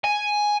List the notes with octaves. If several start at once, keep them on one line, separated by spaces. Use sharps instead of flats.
G#5